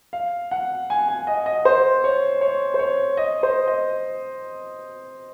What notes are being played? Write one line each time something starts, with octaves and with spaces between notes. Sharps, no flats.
F5
F#5
G#5
G#5
D#5
D#5
C5
C#5
C#5
C5
C#5
D#5
C5
D#5